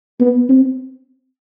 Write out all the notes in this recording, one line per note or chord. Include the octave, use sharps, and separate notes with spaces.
B3
C4